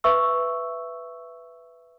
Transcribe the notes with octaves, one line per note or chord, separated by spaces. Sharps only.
B4 E5 C#6 E6